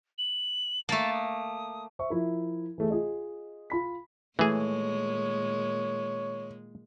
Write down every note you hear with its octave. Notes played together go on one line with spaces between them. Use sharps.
F#7
A3 A#3 A5
D#6
C5 E5 C#6
F3 E4 A#4
E3 A3 G#4
F4 G#4 D#5
F4 B5 B6
A#2 D#3 E3 G#3 A3 G#4 C#5